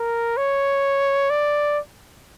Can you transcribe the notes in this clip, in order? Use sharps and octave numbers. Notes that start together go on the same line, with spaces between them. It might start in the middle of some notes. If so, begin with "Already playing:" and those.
Already playing: A#4
C#5
D5